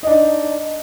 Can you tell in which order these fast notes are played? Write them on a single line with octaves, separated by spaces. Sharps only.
D#5 D4 D#4